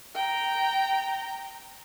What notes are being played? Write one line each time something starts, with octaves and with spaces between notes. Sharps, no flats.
G5 A#5